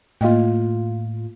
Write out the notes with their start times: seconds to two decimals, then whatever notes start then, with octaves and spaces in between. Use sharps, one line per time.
0.21 A2 A#3 F4 D#5 G5